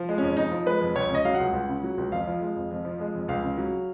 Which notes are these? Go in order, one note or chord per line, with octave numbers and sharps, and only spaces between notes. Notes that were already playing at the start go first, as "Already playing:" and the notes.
Already playing: F3
G#3
F2 C#4
F2 D#4
F3
G#3 B4
F2
C#2 C#5
C#3 D#5
F#3 F5
F#5
C#2
C#2
C#3
F#3
C#2
F2 F5
F3
G#3
F2
F2
F3
G#3
F2
C#2 F5
C#3
F#3